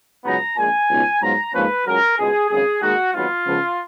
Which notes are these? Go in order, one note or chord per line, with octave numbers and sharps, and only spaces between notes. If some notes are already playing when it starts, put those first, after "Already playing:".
C#2 C#3 F#3 B3 D#4 A#5
A#1 A#2 G#3 G#5
C#2 B2 G#3 D#4
G#2 F#3 B3 F4 A#5
G#2 F3 A#3 C#4 B4
C#2 C#3 F#3 A#4
C#2 B2 G#3 G#4
G#1 F#2 C#3 G#4
D#2 D#3 G#3 D#4 F#4
G#1 G#2 F#3 B3 F4
C#2 C#3 F3 G#3 B3